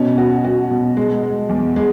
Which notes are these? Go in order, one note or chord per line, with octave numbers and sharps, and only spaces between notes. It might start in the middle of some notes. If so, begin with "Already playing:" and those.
Already playing: B2 C#4
F#4
F#4
B2
G#3
G#3
E2
G#3